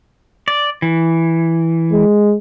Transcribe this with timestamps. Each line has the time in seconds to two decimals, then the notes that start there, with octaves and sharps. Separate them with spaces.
0.48 D5
0.82 E3
1.93 G#3